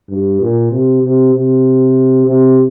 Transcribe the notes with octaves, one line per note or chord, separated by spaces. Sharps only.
G2
A#2
C3
C3
C3
C3